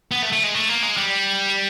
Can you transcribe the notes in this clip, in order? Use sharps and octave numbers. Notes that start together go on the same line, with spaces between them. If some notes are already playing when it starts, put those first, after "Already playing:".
B3
A3
A3
G#3
A3
A#3
G#3
G3